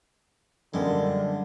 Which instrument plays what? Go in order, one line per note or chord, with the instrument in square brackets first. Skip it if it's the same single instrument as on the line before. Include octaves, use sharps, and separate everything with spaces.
[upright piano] F#2 A#3 [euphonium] D3 [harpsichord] G3 G#3